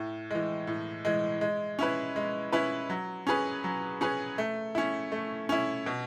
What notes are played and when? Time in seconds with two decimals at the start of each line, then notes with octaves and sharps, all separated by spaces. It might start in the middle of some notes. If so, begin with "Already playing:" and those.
Already playing: A2
0.31 E3 G#3
0.67 A2
1.05 E3 G#3
1.41 G#3
1.79 C#4 E4 B4
2.16 G#3
2.53 C#4 E4 B4
2.90 F#3
3.27 C#4 G#4 B4
3.64 F#3
4.01 C#4 G#4 B4
4.38 A3
4.75 C#4 E4
5.12 A3
5.49 C#4 E4
5.86 B2